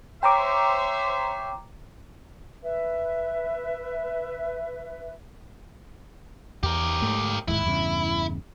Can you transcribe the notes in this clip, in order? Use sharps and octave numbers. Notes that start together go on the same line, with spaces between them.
C5 C#5 E5 G5 A#5 D6
B4 E5
E2 G4 A#4
G#2 A3
D1 D#2 G#2 E4
E2 G2 C#3